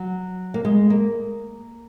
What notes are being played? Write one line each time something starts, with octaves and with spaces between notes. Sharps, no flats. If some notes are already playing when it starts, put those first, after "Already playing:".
Already playing: F#3
A#3
G#3
A#3